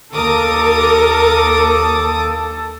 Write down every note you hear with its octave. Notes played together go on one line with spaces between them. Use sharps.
D#2 A4 A#4 D6 D#6